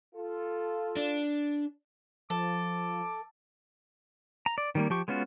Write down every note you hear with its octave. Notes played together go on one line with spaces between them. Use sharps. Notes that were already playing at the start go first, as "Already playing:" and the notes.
F4 A4
D4
F3 A4 D6
A#5
D5
D#3 G3 A#3
F3 G4 C#6
G#3 B3 C#4 F4 F#4